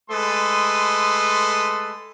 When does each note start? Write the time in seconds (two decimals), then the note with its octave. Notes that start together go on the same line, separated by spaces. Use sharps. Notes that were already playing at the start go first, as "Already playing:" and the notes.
0.10 G#3 A3 A4 B4 C6 D#6